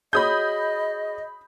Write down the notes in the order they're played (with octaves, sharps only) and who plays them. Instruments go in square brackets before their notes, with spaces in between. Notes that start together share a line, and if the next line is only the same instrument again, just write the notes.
[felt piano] F#4 G#4 C#5 [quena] D#5 [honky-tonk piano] B5 D#6 G6